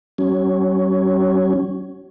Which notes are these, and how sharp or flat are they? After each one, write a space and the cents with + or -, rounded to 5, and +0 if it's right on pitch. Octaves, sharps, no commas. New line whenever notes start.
F#3 +40 C#4 +0